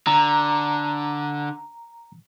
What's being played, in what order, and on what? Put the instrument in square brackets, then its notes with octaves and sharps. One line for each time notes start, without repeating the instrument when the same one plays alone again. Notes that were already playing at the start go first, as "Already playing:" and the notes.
[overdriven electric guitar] D3 [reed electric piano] A#5